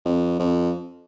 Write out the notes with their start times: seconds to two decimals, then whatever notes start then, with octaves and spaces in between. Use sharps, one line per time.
0.05 F2
0.39 F2